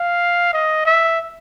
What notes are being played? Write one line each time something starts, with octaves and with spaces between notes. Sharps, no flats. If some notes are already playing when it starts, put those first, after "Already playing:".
Already playing: F5
D#5
E5